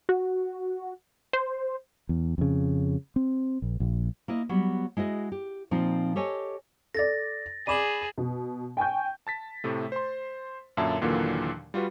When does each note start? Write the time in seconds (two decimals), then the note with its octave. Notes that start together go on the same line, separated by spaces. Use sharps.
0.09 F#4
1.33 C5
2.09 E2
2.38 F2 C#3
3.16 C4
3.62 A#1
3.80 A#1
4.28 A#3 E4 D#5
4.49 F#3 G3 B3
4.97 G#3 E4 F#4 D#5
5.32 G4
5.71 A#2 F3 C4 D#4
6.16 G4 A4 C#5 D#5 G#5
6.95 A4 D5 A6 A#6
7.67 G#4 D5 B5 D6 D#7 E7 F#7
8.18 B2
8.77 G5 G#5 C#6 G6
9.27 A5 A6 B6
9.64 A2 C3 A3
9.92 C5 C6
10.77 F#2 A#2 D3 E5 A5
11.01 D#2 A#2 D3 E3 F#3 A#3
11.74 G3 F4 F#4 B4